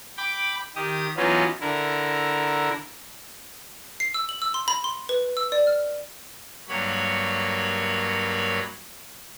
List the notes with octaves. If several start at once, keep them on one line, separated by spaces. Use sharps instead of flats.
G5 B5 D6
D#3 G4 D#6
E3 F#3 B3 C#4 D#4 F4
D3 E4 A#4
C7
E6
F#7
E6
C6
B5
C6
B4
E6
D5
F6
G2 F#3 A#3 C#5 B5